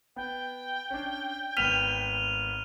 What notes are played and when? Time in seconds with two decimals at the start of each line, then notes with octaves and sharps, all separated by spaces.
0.16 B3 G5
0.90 C#4 D4
1.57 G#1 B3 F6 B6 D#7 F7